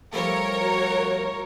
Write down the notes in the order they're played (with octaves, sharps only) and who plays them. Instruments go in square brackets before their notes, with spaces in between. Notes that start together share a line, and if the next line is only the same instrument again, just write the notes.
[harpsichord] F3 G3 A3 [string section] A#4 C#5
[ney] F#4